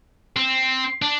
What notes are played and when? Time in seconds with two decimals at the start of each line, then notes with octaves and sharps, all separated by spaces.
0.37 C4
1.02 D4